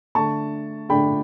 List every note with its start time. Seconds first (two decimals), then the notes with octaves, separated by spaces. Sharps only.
0.15 D3 A3 D4 A5 C#6
0.89 D3 A3 D4 G5 B5